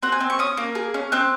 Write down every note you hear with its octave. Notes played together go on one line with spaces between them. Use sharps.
C4 F#5
G#5
C4
C#6
C#4 D#6
A#3
G#4
C#4
C4 F#6